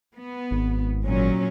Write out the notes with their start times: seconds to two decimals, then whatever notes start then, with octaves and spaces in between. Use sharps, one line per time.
0.16 B3
0.51 G#1
1.04 A#2 F#3 C#4